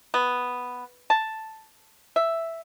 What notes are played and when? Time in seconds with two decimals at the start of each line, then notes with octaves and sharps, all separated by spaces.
0.14 B3
1.10 A5
2.16 E5